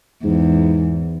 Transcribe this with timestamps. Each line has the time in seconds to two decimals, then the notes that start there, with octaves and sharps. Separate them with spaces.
0.24 E2 G#2